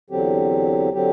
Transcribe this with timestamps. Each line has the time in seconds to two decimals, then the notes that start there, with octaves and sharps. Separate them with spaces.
0.10 E2 D3 F#3 C4 G4
0.92 D3 F#3 C4 G4